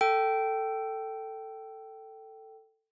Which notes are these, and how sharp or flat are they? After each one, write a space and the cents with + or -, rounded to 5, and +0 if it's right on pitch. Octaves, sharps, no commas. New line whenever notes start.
A4 +10 G5 -15